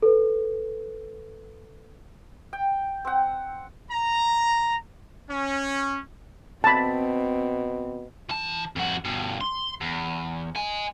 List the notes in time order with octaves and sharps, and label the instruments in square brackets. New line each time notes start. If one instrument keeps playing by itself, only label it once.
[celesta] A4 B4
[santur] G5
C4 F#5
[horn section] A#5
C#4
[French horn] B2 [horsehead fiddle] C4 [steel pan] A5 B5
[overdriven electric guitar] E3 A5
F2 F#4
G2 B2
C6
E2
D#5 G#5